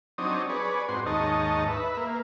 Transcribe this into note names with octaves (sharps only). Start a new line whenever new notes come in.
F#3 C4 D4 D#4 C#5 D#6
G#4 B4 C#5 D5
G#2 C4 F#4 C6
D#2 G#2 D#4 C#5 D#5 A5
B4 E5
A#3